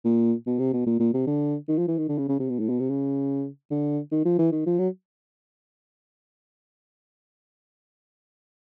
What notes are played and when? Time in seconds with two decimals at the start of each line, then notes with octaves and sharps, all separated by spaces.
0.05 A#2
0.47 B2
0.59 C3
0.73 B2
0.87 A#2
1.00 A#2
1.14 C3
1.27 D3
1.69 D#3
1.78 F3
1.88 E3
1.98 D#3
2.09 D3
2.18 C#3
2.29 C#3
2.39 C3
2.49 B2
2.60 A2
2.69 B2
2.80 C3
2.90 C#3
3.71 D3
4.12 D#3
4.25 F3
4.39 E3
4.52 D#3
4.66 F3
4.79 F#3